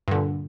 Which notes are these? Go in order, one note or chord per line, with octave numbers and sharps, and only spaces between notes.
G2 A#2 D3